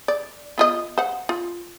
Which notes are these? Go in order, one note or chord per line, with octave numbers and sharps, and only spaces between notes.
D5
B3 F4 D#5
C5 F#5
F4